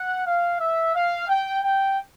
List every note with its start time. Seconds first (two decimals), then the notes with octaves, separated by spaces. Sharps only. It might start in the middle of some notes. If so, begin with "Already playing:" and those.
Already playing: F#5
0.25 F5
0.59 E5
0.94 F5
1.28 G5
1.63 G5